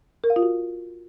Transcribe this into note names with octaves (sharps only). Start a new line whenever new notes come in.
A#4
F5
F4
F#4